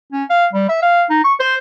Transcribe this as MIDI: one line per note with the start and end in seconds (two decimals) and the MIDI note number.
0.12 0.24 61
0.30 0.47 77
0.53 0.66 55
0.69 0.80 76
0.82 1.04 77
1.10 1.19 63
1.24 1.34 85
1.40 1.56 72